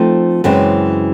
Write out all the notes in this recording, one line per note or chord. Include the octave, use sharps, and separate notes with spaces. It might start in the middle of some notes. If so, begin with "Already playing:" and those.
Already playing: F3 A3 C4 D#4
F#2 C#3 E3 G#3 C4